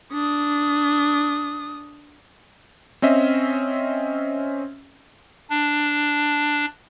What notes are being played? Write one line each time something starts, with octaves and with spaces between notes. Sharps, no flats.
D4 D#6
C4 C#4 D#5 E5
D4